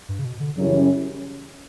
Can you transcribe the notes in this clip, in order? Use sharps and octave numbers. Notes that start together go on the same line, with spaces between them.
G2
C#3
B2
D3
F#2 C#3 F#3 G3 C#4 E4
E3
F#3